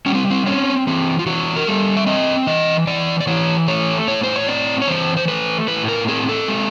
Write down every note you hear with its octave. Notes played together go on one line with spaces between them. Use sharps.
G3 C#4
C4
C4
C4 C#4
E3 C4
F4
E3 F#4
A#4
G3 A4
E5
C4 D#5
E3 D#5
E3 D5
D5
E3 C#5
A3 C#5
A2 C#5
C5
C#5
C4 D5
C#5
E3 C5
C5
A3 B4
A2 B4
A#4
C4 G#4
A4
G#3